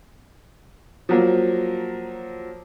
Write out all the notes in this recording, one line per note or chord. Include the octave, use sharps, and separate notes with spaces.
F3 F#3 A#3